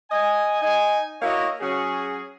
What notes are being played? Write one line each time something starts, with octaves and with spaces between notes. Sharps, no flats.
D#5 G#5
D#4 G#5
A#3 E4 F#4 C#5 D#5
F#3 C#4 F#4 G#4